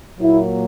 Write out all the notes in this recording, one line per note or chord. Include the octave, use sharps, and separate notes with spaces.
A#2 F#3 A#3 E4